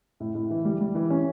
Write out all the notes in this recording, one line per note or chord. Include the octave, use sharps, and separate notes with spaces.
A2
A2
E3
G3
G3
E3
C#4